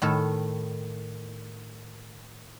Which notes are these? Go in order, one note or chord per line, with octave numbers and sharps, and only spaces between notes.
A2 D#3 A4